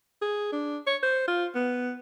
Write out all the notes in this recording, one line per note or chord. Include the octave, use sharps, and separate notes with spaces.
G#4
D4
C#5
C5
F4
B3